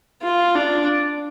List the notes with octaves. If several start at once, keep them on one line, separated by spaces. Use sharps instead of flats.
F4
D4